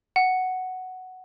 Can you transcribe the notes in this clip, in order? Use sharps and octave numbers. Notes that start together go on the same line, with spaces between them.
F#5